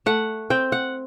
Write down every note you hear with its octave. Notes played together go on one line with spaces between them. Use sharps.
A3 F#5
C4 G5
F#5